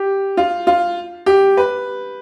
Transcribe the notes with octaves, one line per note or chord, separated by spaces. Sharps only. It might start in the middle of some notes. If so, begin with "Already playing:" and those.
Already playing: G4
F4
F4
G4
B4